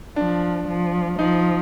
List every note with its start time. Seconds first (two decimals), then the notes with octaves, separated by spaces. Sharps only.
0.16 F3 D4
0.68 F3
1.19 F3 D#4